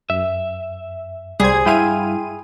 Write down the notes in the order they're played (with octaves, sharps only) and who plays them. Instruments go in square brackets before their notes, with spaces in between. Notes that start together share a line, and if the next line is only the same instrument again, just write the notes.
[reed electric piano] F#2 [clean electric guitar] E5
[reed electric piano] C2 C5 [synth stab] G3 G#6 [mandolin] G#4
[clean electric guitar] G2 F5 [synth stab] E4 D#7 [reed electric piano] G5 C6 G#6